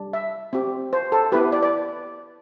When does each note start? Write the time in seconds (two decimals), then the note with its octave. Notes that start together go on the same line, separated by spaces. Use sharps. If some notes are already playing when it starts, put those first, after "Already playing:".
Already playing: G3 D4
0.13 E5
0.53 C4 G4
0.93 C5
1.12 A4
1.32 B3 E4 G4 B4
1.52 D5
1.62 D5